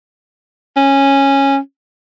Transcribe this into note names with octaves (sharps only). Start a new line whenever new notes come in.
C#4